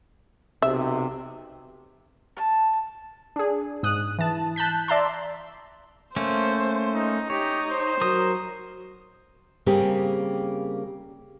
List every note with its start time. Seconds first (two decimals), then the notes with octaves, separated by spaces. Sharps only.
0.62 B1 C3 E5
2.36 A5
3.36 D4 G#4
3.83 G#2 D#6 F#6
4.18 E3 A5
4.56 A5 F#6 G6 B6
4.88 D5 E5 A5 A#5 C6
6.16 A3 A#3 C#4 C5
6.94 D#4
7.30 D#4 G4 C#5
7.71 C5
8.01 F#3 A#4 D#6
9.66 C#3 G3 A#3 C4 G4 G#4